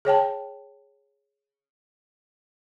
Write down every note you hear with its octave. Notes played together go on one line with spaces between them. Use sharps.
G#4 C#5 G5 A5